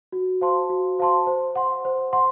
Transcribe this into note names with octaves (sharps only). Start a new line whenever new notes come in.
F#4
C5 F5 A5 C6
F#4
C5 F5 A5 C6
C5
F#5 C6
C5
F#5 C6